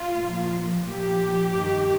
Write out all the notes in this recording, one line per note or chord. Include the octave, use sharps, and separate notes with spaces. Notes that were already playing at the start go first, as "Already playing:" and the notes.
Already playing: F4
A#2 F3
A#2 F3 G4
G2 D#3